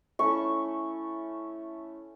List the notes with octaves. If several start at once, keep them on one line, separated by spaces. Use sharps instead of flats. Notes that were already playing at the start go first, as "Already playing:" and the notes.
A3 C#4 E4 C#6